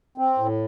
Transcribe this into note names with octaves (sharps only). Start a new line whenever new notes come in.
C4
A2